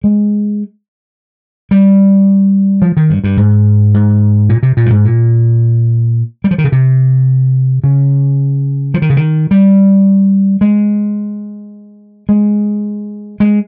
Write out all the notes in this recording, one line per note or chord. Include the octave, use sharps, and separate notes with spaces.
G#3
G3
F3
D#3
G2
G2
G#2
G#2
A#2
C3
A#2
G2
G#2
A#2
G3
F3
D#3
C#3
C3
C#3
F3
D#3
C#3
D#3
G3
G#3
G#3
G#3